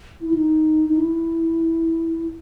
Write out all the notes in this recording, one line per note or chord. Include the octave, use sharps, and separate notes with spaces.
E4
D#4
D#4
E4